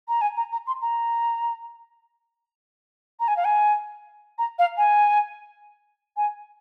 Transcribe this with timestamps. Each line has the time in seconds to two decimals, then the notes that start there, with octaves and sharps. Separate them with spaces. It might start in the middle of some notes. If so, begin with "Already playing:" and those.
0.08 A#5
0.21 G#5
0.37 A#5
0.52 A#5
0.67 C6
0.82 A#5
3.20 A#5
3.28 G#5
3.37 F5
3.45 G#5
4.38 A#5
4.59 F5
4.77 G#5
6.17 G#5